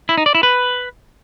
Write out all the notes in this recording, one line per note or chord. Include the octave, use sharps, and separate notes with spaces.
E4
D#4
D5
E4
B4